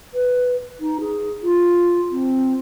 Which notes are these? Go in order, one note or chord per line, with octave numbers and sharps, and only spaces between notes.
B4
D#4
G#4
F4
C4